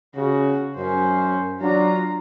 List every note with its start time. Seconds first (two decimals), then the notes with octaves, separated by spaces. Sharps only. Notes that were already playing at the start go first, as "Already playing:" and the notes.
0.16 C#3 F#4
0.77 F#2 C#4 C5
1.61 F#3 D4 F4 A#5